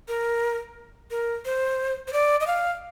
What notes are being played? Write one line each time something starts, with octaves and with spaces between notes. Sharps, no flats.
A#4
A#4
C5
C5
D5
D#5
F5